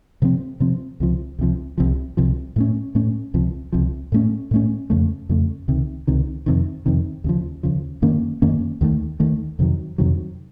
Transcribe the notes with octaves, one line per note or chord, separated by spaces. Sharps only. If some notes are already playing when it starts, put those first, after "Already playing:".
C3 F3 C4
C3 F3 C4
C#2 C3 F3
C#2 C3 F3
C2 C3 F3
C2 C3 F3
A2 A3 C#4
A2 A3 C#4
C#2 C3 F3
C#2 C3 F3
A2 A3 C#4
A2 A3 C#4
F2 C#3 A3
F2 C#3 A3
C#2 C3 D#3
C#2 C3 D#3
F2 C3 D#3
F2 C3 D#3
D#2 C#3 F3
D#2 C#3 F3
F#2 D#3 A#3 C#4
F#2 D#3 A#3 C#4
D#2 D#3 A3
D#2 D#3 A3
F2 C3 D#3 F#3
F2 C3 D#3 F#3